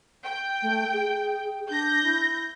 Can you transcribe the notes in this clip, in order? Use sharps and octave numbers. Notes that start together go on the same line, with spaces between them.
G5
A3
G#4
D4 G6 A#6
E4